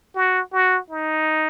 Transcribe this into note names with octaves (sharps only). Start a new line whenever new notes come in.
F#4
F#4
D#4